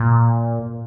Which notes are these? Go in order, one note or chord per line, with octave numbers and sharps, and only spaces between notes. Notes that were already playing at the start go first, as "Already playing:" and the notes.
Already playing: A#2